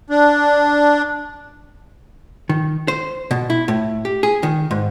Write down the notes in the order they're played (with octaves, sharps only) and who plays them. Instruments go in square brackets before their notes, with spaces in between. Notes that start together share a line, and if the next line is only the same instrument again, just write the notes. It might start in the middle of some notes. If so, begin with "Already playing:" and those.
[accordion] D4
[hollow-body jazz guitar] D#3
C5
B2
E4
A2
G4
G#4
D#3
G#2